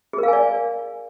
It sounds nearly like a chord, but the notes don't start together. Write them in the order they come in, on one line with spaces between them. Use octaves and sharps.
G#4 A#4 F5 G#5 D5